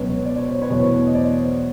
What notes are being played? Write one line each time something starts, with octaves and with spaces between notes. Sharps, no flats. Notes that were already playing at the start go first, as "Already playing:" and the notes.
Already playing: C#2 B2 F#3 B3 B4 C#5
D5
C#5
C5
B4 C#5
E2 B2 F#3 A3
D#5
C5 D5